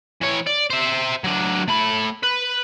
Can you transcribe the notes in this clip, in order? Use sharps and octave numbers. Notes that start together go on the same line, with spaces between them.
E3 C#5
D5
C5 E5
F#3 D4
A3 B5
B4